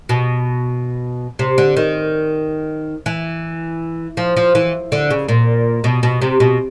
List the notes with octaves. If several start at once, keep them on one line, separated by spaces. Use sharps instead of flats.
B2
C3
D3
D#3
E3
F3
F3
E3
D3
C#3
A#2
B2
B2
C3
B2